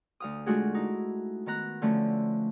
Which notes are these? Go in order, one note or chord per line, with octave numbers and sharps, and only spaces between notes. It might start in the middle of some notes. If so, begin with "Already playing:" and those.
D2 F5 D#6
G#3 A3 D4 F4 F#4 G#4
D#4 E4
D#3 B3 A#5 F#6
D3 F3 A3 C#4